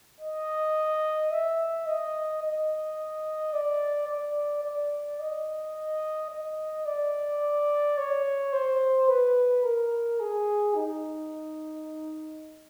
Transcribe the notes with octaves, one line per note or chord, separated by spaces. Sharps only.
D#5
E5
D#5
D#5
D5
D5
D5
D#5
D#5
D5
C#5
C5
B4
A#4
G#4
D#4